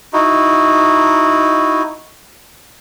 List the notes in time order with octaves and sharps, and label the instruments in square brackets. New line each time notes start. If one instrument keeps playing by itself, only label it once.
[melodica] D#4 E4 F#4